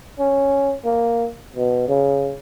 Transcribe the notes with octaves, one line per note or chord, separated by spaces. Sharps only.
C#4
A#3
B2
C#3